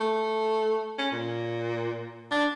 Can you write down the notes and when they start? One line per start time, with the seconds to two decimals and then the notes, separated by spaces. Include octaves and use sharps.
0.01 A3
0.98 C#4
1.12 A#2
2.31 D4